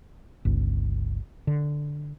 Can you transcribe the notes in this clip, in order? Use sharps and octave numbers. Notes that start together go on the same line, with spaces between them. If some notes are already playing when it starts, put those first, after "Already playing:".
G1 C#2
D3